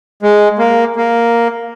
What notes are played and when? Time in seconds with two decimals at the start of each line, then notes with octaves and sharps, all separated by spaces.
0.23 G#3
0.59 A#3
0.96 A#3